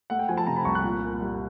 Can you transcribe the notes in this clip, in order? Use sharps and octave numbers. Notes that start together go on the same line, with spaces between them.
A3 F#5
G5
F3 G#5
A5
C3 A#5
B5
C2 C#6
F#6
A#2
A#3
G3